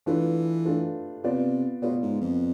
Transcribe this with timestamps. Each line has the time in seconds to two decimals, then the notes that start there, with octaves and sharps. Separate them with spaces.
0.06 E3 A3 D4 F4 B4
0.65 A3 D4 F4 B4
1.23 C3 B3 F4 B4 D5
1.82 B2 B3 F4 B4 D5
2.02 G#2
2.21 F2